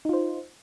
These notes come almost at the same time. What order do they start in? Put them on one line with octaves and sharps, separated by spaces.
D#4 F4 C5